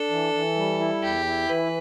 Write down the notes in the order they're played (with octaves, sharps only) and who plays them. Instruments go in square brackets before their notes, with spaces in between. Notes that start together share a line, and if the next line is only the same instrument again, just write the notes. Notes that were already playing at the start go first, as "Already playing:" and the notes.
Already playing: [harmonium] D4 [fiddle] A4
[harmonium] E3
E3
G3
E4
[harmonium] E2 [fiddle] G4
[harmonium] E4
[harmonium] E3 [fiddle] B4